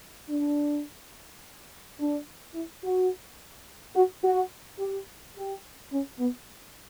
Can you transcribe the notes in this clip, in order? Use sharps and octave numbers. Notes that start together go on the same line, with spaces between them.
D4
D4
E4
F#4
F#4
F#4
G4
G4
C#4
B3